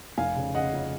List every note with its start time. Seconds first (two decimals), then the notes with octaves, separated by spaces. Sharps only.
0.18 F1 F5 G#5
0.36 C#3
0.55 C#3 D#5 F#5
0.73 F2